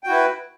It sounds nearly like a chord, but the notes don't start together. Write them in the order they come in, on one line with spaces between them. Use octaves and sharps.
G5 F#4 E4 B4